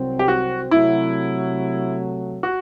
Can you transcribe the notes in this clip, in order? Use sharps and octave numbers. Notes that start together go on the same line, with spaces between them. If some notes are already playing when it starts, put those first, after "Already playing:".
Already playing: C2 C3 F#3 C4
G4
F#4
C3 F#3 A3 E4
F#4